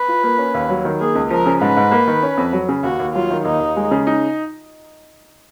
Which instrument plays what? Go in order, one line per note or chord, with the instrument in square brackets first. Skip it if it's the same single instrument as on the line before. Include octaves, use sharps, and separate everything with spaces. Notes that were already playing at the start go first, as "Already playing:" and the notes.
Already playing: [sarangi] B4
[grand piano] F4
A#3
C#4
D#2
F#3
D#3
[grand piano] A#3 [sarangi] G#4
[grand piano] C#2
[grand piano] F3 [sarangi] A#4
[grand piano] C#3
[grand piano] G#2 [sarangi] B4
[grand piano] G#2
A#3
D#3
C#4
F2
F#3
C#3
[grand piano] D#2 [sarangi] F#4
[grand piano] D#2
[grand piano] F#3 [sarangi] F4
[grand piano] D#3
[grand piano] D#2 [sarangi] D#4
[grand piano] D#2
G#3
C#3
D#4